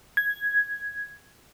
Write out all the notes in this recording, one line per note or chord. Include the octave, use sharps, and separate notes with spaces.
G#6